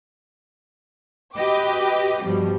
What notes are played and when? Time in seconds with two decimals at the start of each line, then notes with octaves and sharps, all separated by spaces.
1.35 F#4 G4 B4 D#5 G5 D6
2.23 G2 B2 F3 G3